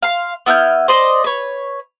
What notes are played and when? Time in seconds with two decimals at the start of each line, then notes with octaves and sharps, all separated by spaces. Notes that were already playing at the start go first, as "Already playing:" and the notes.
0.03 F5 C6
0.46 B3 E4 F6 G6
0.88 C5 D5 D#5 D#6
1.24 B4 C#5